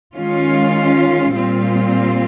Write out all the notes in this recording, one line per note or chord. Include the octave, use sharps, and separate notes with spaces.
D#3 G#3 C#4 F4
A#2 G3 C4 F4